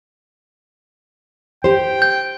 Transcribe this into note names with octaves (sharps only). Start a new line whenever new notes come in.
G4 C5 G5
G6